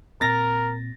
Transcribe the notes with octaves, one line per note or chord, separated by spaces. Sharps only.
A#2 C4 A#4 A6 A#6